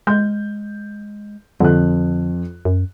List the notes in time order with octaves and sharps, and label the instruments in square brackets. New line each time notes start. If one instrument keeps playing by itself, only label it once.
[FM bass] G#3 [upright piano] G6
[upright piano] F2 F#6 [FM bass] D3
[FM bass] F#2